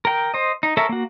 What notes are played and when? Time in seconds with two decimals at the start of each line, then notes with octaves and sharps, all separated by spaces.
0.05 A#4 G5
0.34 C5 D#5
0.63 D#4
0.77 A4 A#4 C#5 E5
0.89 A#3 F#4